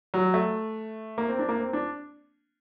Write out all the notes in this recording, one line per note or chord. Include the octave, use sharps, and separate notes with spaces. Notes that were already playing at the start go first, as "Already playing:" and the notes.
F#3
A3
A#3
C4
D4
A#3
C4
D4